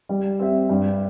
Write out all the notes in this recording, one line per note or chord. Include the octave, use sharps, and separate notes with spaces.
G3
C4 G4 E5
G2